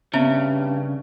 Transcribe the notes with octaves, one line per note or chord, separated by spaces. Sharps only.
G2 C#3 B3 C4 E5